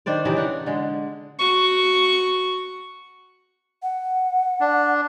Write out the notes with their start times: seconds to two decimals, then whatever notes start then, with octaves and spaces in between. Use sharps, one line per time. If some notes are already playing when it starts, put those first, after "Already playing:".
0.06 D#3 D4 C5 D5
0.25 C#3 E3 D#4 G4
0.37 D4 F#5
0.66 D3 G#3
1.39 F#4 C#6
3.83 F#5
4.60 D4